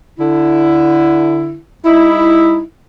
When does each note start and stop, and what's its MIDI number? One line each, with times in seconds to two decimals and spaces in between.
0.19 1.57 50
0.19 1.57 64
1.85 2.62 55
1.85 2.62 63
1.85 2.62 64